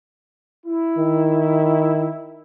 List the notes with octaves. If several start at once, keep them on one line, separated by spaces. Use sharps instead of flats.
E4
D#3